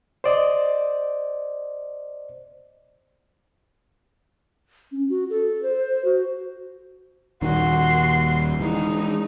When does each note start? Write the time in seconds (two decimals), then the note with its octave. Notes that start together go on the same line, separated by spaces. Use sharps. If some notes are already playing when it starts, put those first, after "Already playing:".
0.24 C5 D5 D#5
4.92 C#4
5.10 F#4
5.30 A4
5.63 C5
6.05 F#4
7.42 D#1 D#3 F#4 C6
8.61 E3 G#3 D#4